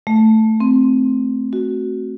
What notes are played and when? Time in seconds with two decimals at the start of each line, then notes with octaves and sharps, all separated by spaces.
0.07 A3
0.60 C4
1.53 F#4